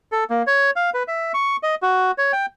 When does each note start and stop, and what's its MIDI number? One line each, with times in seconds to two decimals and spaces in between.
0.12 0.24 69
0.30 0.42 58
0.47 0.71 73
0.76 0.90 77
0.94 1.03 71
1.08 1.32 76
1.34 1.56 85
1.63 1.75 75
1.82 2.11 66
2.18 2.32 73
2.33 2.46 79